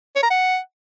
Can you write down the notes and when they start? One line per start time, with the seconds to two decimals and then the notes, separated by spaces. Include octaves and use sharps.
0.16 C#5
0.23 A#5
0.30 F#5